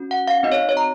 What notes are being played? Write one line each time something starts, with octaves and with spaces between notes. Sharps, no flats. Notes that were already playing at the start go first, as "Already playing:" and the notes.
Already playing: C#4 F#4
F#5
F5
C4 D#4 F#4 D#5
C#5
C#5
A#5